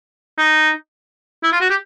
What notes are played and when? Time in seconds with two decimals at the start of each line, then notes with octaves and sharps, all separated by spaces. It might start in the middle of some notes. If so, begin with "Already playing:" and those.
0.38 D#4
1.43 E4
1.52 F4
1.61 F#4
1.70 G4